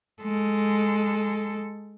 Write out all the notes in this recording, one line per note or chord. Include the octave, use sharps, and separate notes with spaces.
G#3 A4